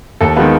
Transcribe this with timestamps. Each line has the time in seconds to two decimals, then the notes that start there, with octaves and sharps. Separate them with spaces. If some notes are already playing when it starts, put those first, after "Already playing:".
0.21 D#2 A4
0.36 D#3 G#3 B3 F4